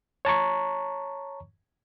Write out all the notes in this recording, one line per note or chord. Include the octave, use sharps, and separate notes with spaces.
C#5 A5 A#5 C#6